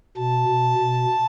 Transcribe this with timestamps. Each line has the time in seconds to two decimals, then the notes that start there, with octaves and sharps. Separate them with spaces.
0.18 B2 A5
0.49 B2
0.79 B2